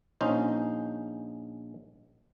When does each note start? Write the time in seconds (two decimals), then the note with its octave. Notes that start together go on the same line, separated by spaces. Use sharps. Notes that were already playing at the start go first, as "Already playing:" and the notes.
0.21 A#1 C#4 D#4 C5